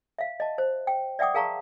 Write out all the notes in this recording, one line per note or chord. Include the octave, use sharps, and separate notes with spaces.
E5 F5
D#5 A5
C5
G5
D5 E5 F#5 G5 D6 D#6
G#4 A#4 F5 A5 A#5 C#6